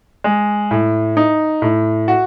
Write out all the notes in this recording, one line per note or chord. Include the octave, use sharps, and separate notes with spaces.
G#3
A2
D#4
A2
F#4